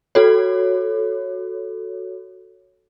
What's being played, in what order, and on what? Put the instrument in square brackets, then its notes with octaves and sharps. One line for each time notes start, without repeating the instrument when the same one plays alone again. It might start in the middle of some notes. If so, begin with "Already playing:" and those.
[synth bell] F#4 A4 C#5